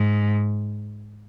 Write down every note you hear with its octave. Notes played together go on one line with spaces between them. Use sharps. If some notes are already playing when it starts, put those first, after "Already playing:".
Already playing: G#2